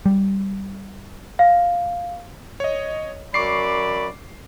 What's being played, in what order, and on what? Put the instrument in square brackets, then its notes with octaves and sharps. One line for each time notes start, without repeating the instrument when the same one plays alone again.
[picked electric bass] G3
[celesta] F5
[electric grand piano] C#5 D#5
[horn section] F#2 D5 B5 [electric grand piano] C#6 D6 C7